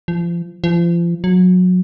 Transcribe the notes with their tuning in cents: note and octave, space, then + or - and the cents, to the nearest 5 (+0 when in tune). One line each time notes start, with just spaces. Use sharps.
F3 -30
F3 -35
F#3 -25